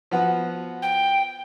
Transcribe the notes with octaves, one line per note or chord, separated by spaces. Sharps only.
F3 B3 F#4
G5